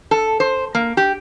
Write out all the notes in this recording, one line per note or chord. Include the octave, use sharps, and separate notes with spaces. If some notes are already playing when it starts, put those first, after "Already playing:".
A4
C5
A#3
G4